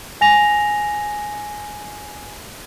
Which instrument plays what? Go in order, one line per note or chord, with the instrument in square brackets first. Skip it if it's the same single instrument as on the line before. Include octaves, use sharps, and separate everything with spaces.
[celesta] G#5 A#6 F7